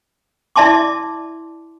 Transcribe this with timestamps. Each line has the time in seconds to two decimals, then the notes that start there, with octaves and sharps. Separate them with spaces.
0.56 E4 D5 E5 A5 C6 D6